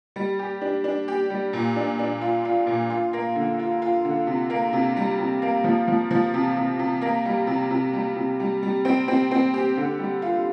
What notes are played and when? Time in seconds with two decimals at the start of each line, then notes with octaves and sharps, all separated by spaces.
0.16 G3
0.39 G4
0.61 D4
0.84 D4
1.08 G4
1.30 G3
1.53 A#2
1.76 D4
1.99 D4
2.21 F4
2.45 F4
2.67 A#2
2.90 F4
3.13 A#3
3.36 D3
3.59 F4
3.82 F4
4.05 D3
4.27 C3
4.50 A#3
4.73 C3
4.97 G3
5.19 C3
5.42 A#3
5.64 F3
5.88 F3
6.11 F3
6.34 C3
6.57 C3
6.79 C3
7.01 A#3
7.25 G3
7.47 C3
7.71 C3
7.93 G3
8.16 C3
8.40 G3
8.63 G3
8.85 C4
9.08 C4
9.31 C4
9.54 G4
9.77 D3
9.99 G3
10.22 F4